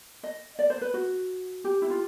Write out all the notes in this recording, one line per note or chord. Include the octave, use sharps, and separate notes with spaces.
D#5
D5
C5
B4
F#4
G4
E4
F4